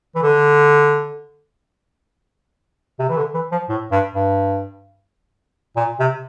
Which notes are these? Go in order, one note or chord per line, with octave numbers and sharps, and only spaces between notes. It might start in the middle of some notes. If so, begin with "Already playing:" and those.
E3
D3
C3
E3
D3
E3
F3
A2
G2
G2
A#2
C3